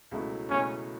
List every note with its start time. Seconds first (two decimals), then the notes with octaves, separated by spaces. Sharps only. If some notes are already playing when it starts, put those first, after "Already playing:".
0.11 C#2 B2 F#3 A3 E4
0.50 C#2 B2 F#3 A3 C#4 E4